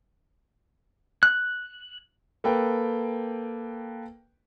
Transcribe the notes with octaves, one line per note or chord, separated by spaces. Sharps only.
F#6
A#3 A4 B4 G5